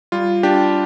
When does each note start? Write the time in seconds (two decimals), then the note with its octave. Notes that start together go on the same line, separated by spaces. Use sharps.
0.12 G3 F4
0.43 D4 G4